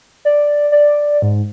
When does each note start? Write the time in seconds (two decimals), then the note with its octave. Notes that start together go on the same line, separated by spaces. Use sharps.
0.25 D5
0.72 D5
1.22 G#2